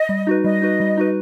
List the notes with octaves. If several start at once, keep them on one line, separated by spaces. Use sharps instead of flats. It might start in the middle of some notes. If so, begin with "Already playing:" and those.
Already playing: D#5
G3
D#4 F#4 B4
G3 D#5
D#4 F#4 B4
G3
D#4 F#4 B4